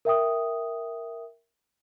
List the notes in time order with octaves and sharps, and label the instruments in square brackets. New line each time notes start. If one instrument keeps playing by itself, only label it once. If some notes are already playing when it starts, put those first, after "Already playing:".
[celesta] A#4 E5 G5 D#6